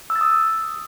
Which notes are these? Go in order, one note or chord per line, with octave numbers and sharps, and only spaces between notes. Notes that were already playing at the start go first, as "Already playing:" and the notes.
E6
A6
D#6